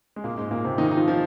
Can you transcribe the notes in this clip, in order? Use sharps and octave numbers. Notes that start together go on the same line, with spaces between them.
G#3
A#2 A#3
G#2 G#3
A#2 A#3
C3 C4
D#3 D#4
D#4
F3 F4
F3